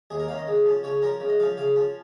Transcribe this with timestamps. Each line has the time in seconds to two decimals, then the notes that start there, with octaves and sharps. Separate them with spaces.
0.10 D#2 G#4
0.20 A#4
0.28 D#3 C#4 F5
0.38 D#5
0.47 C#3
0.65 F3 C#4
0.83 C#3 C#5
1.02 F3 C#4 A#4
1.20 C#3
1.29 D#5
1.40 F3 C#4 F5
1.57 C#3 F5
1.76 F3 C#4